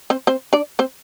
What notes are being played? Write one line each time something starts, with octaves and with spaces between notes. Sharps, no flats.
C4 C5
C4 C5
D4 D5
C4 C5